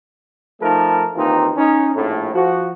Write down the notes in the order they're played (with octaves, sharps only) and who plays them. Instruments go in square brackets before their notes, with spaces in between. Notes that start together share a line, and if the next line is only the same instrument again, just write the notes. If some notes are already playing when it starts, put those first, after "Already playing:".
[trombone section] F3 A3 D#4 A4 A#4
D#2 E3 C4 D#4 F4
C#4 D#4
A#1 A2
F3 F#4